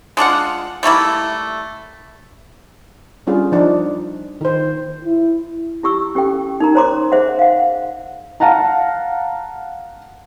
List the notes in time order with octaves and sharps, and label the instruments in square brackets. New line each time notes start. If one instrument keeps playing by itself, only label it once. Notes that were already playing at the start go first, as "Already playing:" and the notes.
[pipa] G#3 D4 F4 F#5
G3 A3 A#3 E4
[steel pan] G3 C#4 D4 F4 G#4
F3 D4 D#4
D#3 C5
[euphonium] E4
[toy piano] E4 G4 C#6 E6
C#4 G4 A4 G5
D#4 A#4 A#5
C5 C#5 A#5 C6 D6
G#4 C5 E5 F#5
F5 F#5
[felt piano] F5 F#5 A5 A#5